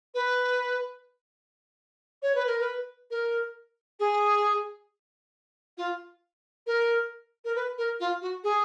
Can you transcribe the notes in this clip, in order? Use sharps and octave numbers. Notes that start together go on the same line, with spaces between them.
B4
C#5
B4
A#4
B4
A#4
G#4
F4
A#4
A#4
B4
A#4
F4
F#4
G#4